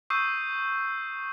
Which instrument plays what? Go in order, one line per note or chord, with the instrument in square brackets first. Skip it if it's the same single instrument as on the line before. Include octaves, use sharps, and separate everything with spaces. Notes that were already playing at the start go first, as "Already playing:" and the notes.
[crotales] C#6 D#6 E6 G6 C7 D#7